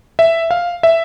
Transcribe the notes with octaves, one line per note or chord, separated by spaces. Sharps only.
E5
F5
E5